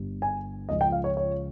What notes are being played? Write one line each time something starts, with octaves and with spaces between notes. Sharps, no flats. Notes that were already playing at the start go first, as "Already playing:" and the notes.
Already playing: G1 G2 G3
G#5
C#2 C#3 F3 D#5
G5
F5
C#5
C#5